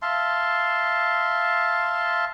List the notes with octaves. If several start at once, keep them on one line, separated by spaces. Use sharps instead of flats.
E5 F5 A5 C6